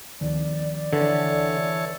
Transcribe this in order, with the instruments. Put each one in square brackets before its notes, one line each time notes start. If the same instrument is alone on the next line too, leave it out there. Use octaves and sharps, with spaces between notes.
[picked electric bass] D2 D#3 F3 [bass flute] D5
[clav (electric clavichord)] D3 [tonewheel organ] E3 A4 C#5